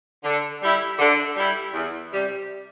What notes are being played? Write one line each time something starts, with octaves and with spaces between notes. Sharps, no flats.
D3
G3 E4
D3
G3 E4
E2
C3 G3